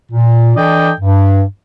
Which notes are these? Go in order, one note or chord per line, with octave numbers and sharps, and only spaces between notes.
A#2
E3 D4 A4 D5 D#5 G5
G2